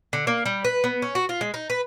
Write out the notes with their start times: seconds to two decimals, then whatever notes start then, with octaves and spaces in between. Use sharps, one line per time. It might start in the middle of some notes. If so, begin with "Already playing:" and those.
0.13 D3
0.27 A#3
0.46 G3
0.65 B4
0.84 B3
1.02 C#4
1.15 F#4
1.29 F4
1.41 G#3
1.54 D#4
1.70 B4